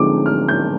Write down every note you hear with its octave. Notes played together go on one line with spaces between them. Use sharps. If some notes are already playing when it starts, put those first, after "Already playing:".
Already playing: D3 F3 G#3 C4 D#4 D6
F6
G6